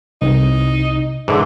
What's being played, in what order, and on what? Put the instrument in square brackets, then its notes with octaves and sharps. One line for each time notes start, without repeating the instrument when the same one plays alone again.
[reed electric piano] C2 [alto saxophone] D#4
[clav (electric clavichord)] G#2 D3 [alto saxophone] E3